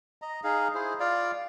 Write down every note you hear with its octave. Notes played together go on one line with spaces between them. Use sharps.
D#5 A#5
D#4 G#4 F5
E4 G#4 C5
F4 D5 F5